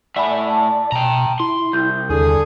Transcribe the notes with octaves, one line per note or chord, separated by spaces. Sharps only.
A2 D5 E5 F#5 G#5 B5
A5
B2 G5 A#5
E4 C6
C2 G6
D#2 D3 G#4